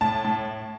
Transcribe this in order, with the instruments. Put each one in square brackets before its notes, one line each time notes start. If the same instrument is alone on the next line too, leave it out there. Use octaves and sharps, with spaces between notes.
[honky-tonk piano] A2 A5
A2